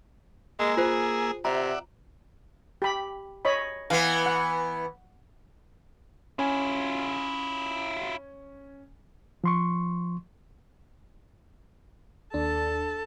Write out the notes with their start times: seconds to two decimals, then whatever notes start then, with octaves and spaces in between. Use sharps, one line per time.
0.60 G#3 A#3 G#5 E6
0.77 F4 G#4 C5
1.45 C3 D5 E5 F#5 A#5
2.82 G4 B5
3.45 C#5 D#5 B5
3.90 E3 B3 F5
4.26 F#5
6.39 C#4 E4 F4 G#5
9.44 F3 C6 C#6
12.34 D#2 D4 A4 A5